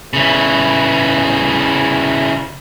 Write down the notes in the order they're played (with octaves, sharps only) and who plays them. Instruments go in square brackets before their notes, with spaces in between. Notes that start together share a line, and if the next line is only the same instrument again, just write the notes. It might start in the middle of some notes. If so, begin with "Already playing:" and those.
[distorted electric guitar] C#3 E3